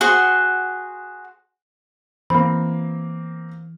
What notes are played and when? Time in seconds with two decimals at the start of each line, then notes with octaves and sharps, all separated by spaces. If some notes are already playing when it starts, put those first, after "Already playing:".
0.01 F#4 G#4 C5 F#5
2.30 E3 A#3 C4 B5